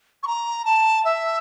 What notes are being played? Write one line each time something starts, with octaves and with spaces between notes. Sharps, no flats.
C#6
A#5
A5
E5